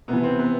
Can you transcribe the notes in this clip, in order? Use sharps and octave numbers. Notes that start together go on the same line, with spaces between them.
C3 B3
E3
C4
B3